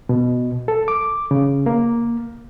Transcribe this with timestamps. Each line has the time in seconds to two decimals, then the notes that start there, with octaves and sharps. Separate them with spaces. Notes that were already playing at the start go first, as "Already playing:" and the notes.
0.09 B2
0.68 A4
0.88 D6
1.31 C#3
1.66 A#3